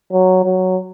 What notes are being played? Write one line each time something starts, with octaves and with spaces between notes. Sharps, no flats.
F#3
F#3